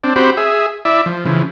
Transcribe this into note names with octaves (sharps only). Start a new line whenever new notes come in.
C4 D4
C4 F#4 G4 C5 B5
G#4 E5
E4 D5 E5
F3
C#3 E3 F3